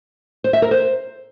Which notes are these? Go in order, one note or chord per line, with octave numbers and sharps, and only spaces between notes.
C5
E5
A#4
C5